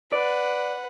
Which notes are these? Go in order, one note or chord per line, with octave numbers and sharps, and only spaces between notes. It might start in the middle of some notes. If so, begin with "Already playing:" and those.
B4 D5 F#5